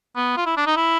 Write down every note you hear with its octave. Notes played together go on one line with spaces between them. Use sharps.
B3
F4
E4
D4
D#4
E4